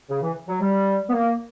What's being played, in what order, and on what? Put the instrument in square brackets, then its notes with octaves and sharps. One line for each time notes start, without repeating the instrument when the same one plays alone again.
[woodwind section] C#3
E3
F#3
G3
B3
A#3